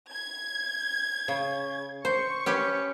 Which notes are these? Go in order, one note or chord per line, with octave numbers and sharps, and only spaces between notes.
G#6
C#3
C5 C#6
C#4 G4 B4